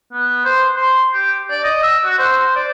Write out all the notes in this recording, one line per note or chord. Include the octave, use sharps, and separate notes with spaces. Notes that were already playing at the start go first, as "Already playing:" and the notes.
B3
C5
C6
G4
D5
D#5
E6
F#4
C5
D5